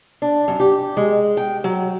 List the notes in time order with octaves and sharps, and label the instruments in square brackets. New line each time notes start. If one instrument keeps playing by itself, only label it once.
[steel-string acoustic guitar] D4
F#2
G4
G#3
G5
F#3